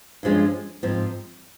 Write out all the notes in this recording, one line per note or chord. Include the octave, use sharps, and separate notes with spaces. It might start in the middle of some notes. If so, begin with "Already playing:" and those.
G2 F3 G#3 C#4
G#2 F3 C4